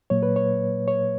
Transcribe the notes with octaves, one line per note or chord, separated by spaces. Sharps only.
A#2 F#3 A#3 C#5
B4
C#5
C#5